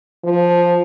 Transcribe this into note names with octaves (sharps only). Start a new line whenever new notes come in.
F3